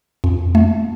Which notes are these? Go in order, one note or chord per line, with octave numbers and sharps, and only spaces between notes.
F2
A3